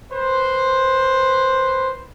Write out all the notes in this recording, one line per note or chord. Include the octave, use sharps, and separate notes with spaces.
B4 C5